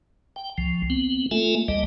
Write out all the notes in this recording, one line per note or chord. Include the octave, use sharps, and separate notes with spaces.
G5
C#2 F3
B3 C4
A3 A#3 F4 A4 E5 G#5
D2 G3 D#5